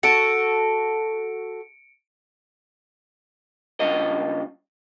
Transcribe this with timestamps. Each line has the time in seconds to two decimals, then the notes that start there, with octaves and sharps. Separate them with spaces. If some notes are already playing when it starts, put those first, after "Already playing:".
0.03 F#4 A4 C#7 D7
3.80 G2 C#3 F4 D#5